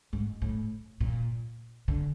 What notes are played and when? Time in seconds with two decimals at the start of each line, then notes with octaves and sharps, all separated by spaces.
0.13 G#2
0.42 A2
1.01 A#2
1.88 D3